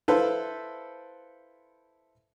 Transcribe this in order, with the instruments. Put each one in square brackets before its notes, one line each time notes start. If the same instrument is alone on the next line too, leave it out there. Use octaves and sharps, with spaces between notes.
[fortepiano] E4 A4 B4 C5 E5 F5